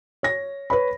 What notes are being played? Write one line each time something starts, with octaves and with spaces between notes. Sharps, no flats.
C#5 A#6
B4 C#5 B5